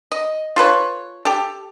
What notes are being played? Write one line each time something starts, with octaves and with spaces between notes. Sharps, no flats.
D#5
F4 A4 B4 C#5
G4 A4